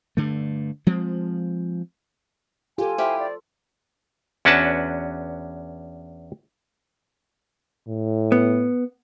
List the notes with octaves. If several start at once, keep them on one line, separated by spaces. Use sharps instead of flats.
G2 D3 A3
F3 G#3 C4
F4 G4 A4 G#5
E4 G4 C5 F5
D5
E2 C#4 D4 F#4 B4 A5
A2
B3